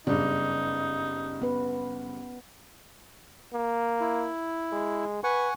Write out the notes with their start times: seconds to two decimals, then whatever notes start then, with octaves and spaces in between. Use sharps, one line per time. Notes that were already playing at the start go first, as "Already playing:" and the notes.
0.07 F#1 G2 B3 D#4 D5
1.42 B3 B4
3.54 A#3
4.00 E4
4.72 G#3
5.24 B4 F#5 G#5 C#6